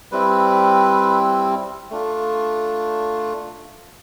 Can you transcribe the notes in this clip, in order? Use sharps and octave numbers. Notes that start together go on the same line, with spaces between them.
G3 C4 E4 B4
A3 D4 F4